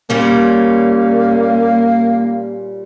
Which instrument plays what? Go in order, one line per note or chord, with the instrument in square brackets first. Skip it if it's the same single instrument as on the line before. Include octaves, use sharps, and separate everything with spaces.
[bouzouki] A#2 G3 C#4 [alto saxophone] A#3